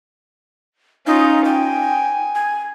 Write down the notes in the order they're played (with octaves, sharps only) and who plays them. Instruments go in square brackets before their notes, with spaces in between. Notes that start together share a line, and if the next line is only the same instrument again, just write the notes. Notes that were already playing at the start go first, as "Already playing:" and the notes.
[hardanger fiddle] C#4 F4 [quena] D#4
[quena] G5 [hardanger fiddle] G#5
[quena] G#5